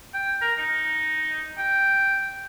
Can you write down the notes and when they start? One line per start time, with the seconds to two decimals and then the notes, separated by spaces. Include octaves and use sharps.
0.14 G5
0.41 A#4
0.58 D#4
1.58 G5